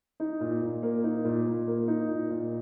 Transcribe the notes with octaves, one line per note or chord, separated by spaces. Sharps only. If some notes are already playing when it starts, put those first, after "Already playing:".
D#4
A#2
A#2
A#3
D#4
A#2
A#2
A#3
D#4
A#2
A#2